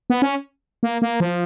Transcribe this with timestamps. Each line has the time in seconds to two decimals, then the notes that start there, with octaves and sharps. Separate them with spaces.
0.10 B3
0.22 C#4
0.83 A#3
1.02 A#3
1.20 F3